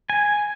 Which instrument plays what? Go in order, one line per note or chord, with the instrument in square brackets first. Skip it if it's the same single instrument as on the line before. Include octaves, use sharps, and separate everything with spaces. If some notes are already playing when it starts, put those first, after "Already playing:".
[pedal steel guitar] G#5